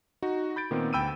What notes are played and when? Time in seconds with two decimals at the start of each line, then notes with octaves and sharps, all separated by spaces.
0.22 D#4 F#4
0.56 B5 G6 A6 D7
0.71 A#2 D#3 B3 C4
0.93 D2 G5 B5 E6 D7 D#7